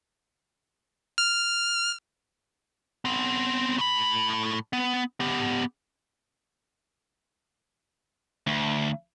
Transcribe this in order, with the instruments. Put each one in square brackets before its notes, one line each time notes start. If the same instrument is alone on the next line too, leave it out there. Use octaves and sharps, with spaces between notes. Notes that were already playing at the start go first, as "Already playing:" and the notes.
[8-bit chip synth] F6
[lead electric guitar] B3 C4
A2 B5
B3
B3 G4
[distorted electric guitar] D2